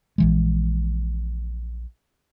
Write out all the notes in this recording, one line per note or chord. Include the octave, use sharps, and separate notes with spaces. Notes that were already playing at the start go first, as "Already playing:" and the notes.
A#1 E3 G#3